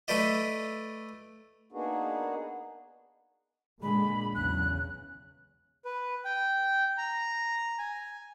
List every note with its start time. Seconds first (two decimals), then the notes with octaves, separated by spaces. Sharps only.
0.08 A3 A4 B4 D5 D#5
1.72 A#3 B3 D4 D#4 F#4 G#4
3.83 A#2 D3 G#3 B5
4.35 B1 E2 C#3 F#6
5.85 B4
6.25 G5
6.98 A#5
7.78 G#5